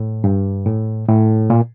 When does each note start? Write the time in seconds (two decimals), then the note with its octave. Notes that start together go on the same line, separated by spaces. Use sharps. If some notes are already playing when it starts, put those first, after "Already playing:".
Already playing: A2
0.24 G2
0.66 A2
1.08 A2
1.50 A#2